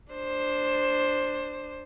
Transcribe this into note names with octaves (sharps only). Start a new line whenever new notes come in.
D4 C5